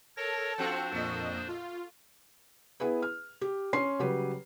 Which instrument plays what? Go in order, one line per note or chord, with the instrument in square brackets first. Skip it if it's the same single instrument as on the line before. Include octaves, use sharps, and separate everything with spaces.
[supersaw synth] A4 A5 [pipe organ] A#4 C#5 A#6
[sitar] F3 C4 F#4 [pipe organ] D4 C5
[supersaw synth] F2 A#2 D#5 [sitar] A3
[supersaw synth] F4
[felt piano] B3 E4 G#4 B4
F6
G4
C#4 C6 C7
C#3 F#3 G3 G4 B4